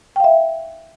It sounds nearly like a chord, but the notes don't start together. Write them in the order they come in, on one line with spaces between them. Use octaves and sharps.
G5 F5 E5